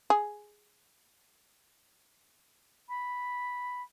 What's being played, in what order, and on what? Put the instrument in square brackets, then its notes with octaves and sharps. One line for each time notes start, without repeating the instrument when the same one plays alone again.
[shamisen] G#4
[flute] B5